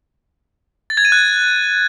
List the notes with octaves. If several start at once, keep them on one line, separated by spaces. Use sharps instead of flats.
A6
G#6
D#7
F#6